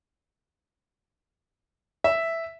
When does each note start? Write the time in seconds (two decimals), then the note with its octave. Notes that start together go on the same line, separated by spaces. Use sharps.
2.04 E5